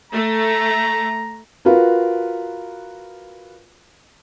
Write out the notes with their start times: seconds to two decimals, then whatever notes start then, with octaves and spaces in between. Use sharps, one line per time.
0.12 A3 A#5
1.65 F4 F#4 A#4 B4